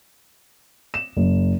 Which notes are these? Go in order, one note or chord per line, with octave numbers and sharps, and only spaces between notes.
E7
F#1